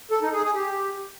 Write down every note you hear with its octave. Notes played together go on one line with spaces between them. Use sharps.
A4
D#4
G#4
G#4
G4